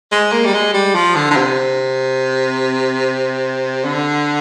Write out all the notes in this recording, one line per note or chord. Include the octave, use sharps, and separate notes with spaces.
G#3
A#3
G3
G#3
G3
F3
D3
D3
C3
D3